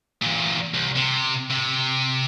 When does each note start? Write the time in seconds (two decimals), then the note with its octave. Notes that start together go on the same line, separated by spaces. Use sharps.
0.22 E2 A#2
0.74 C2
0.96 C3
1.51 C3